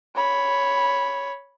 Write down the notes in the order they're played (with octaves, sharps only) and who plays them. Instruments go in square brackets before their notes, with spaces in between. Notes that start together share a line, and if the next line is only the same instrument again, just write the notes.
[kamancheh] C#5 B5